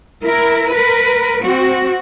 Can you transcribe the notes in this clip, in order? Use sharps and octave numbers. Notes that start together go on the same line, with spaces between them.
E4 A#4
A#4 B4
C4 F#4